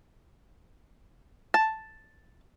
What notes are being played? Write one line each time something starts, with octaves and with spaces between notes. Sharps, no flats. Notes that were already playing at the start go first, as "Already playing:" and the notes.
A5